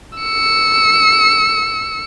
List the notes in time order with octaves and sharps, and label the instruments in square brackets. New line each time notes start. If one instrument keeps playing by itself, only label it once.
[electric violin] E6 C#7